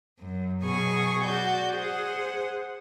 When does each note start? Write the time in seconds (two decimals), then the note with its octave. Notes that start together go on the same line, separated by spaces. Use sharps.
0.20 F#2
0.63 B2 F#3 B3 G#4 G#5 C#6
1.22 F#4 D5 G6
1.74 G#4 C5 F#5